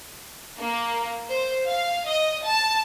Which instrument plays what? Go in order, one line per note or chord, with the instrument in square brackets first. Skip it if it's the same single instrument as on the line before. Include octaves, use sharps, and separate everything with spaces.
[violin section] A#3
C5
F5
D#5
A5